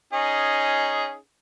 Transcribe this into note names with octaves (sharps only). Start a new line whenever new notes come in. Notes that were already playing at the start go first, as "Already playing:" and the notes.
C#4 D#4 G#4